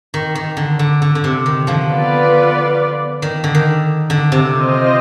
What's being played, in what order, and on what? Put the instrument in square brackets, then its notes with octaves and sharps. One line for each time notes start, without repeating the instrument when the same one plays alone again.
[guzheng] D#3
D#3
D3
D3
D3
D3
C3
D#3
D3 F3
[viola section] B3 F4 B4 D5
[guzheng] D#3
D3
D#3
D3
C3
[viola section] C4 F4 C5 D#5